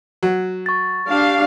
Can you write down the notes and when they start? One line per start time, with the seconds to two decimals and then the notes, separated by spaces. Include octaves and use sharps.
0.23 F#3
0.66 C#6 A6
1.07 D4 G4 F5